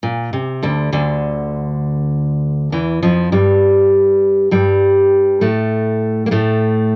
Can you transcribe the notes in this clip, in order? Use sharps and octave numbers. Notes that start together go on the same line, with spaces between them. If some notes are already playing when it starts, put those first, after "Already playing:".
A#2
C3
D2 D3
D2 D3
E2 E3
F2 F3
G2 G3
G2 G3
A2 A3
A#3
A2 A3